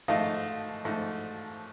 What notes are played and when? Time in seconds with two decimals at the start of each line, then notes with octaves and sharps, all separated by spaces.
0.08 G#2 F3 A3 D#5 F5
0.85 G#2 F3 A3